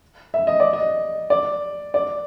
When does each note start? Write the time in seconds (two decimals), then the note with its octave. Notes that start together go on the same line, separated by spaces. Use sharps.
0.34 E5
0.47 D#5
0.60 D5
0.73 D#5
1.30 D5
1.94 D5